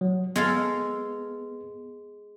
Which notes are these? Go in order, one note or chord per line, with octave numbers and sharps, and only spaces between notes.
F#3
G#3 B3 A4 F5